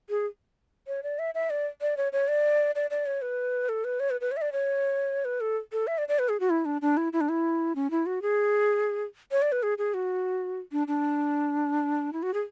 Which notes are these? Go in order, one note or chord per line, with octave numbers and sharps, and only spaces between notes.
G#4
C#5
D5
E5
E5
D5
D5
C#5
C#5
D5
D5
D5
C#5
B4
A4
B4
C#5
B4
B4
C#5
E5
D5
C#5
B4
A4
A4
E5
D5
D5
B4
G#4
F#4
E4
D4
D4
E4
E4
D4
E4
C#4
E4
F#4
G#4
C#5
D5
B4
G#4
G#4
F#4
D4
D4
E4
F#4
G#4